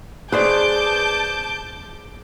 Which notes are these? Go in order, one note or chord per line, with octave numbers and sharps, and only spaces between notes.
G#4 B4 C5 D5 A5 D6 G6